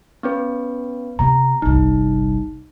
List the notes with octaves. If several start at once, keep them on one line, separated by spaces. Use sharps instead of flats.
B3 C#4 B4
C3 B3 A#5
G1 C2 D#4